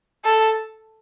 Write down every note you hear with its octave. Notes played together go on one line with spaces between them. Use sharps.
A4